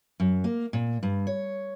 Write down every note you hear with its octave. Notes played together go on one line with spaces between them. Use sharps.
F#2
A#3
A#2
G2
C#5